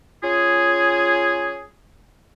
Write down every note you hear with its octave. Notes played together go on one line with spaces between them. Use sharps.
C#4 F4 G#4